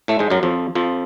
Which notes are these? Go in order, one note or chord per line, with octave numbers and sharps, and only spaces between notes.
A2 A3
G#2 G#3
F#2 F#3
F2 F3
F2 F3